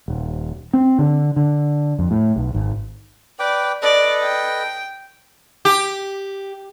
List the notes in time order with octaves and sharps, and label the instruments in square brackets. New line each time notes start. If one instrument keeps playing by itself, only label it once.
[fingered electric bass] D#1
C4
D3
D3
F2
A2
B1
G#1
[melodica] B4 G5 D6 [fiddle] D5
[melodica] A4 B4 D#5 [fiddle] D5
[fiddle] G5
[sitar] G4